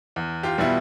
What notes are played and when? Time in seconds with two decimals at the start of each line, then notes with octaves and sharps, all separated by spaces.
0.16 E2
0.43 F4 G4
0.58 B2 G3 B3 E4